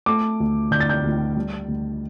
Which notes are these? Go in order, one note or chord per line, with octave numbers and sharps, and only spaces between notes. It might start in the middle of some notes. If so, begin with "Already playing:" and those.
A3 D6
D2
D3 G6
A6
G6
D2
G3
D2